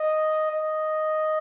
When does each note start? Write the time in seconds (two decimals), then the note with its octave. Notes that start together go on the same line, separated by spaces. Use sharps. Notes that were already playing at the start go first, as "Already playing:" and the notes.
Already playing: D#5
0.51 D#5